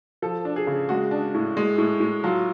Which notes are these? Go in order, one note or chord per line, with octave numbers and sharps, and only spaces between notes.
F3 A4
D4
G#4
C#3
G#3 F#4
D4
A2
G#3
A2
A2
F#3 F4